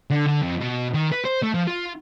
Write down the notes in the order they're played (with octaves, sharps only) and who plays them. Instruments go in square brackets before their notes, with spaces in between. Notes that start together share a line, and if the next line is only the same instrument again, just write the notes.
[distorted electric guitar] D3
D3
F2
B2
D#3
B4
C5
A3
F3
F4